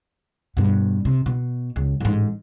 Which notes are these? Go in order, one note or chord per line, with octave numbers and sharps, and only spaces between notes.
G2 B2
C3
B2
C#2
A1 G#2